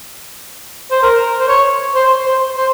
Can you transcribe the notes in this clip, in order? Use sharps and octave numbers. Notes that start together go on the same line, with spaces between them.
C5
A#4
C5
C#5
C5
C5
C5